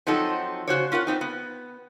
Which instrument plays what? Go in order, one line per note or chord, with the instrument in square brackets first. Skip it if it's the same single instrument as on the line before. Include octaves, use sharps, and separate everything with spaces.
[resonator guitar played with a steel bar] F3 F#3 C4 D#4 F#4 A4
C#3 F#4 C5 C#5
C#4 F4 A#4 F#5
B3 C4 D#4
B3